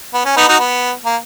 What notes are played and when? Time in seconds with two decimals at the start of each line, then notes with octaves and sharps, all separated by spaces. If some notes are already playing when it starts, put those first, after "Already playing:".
0.14 B3
0.25 C#4
0.37 B3 D#4
0.48 D#4 F#4
0.59 B3
1.05 A#3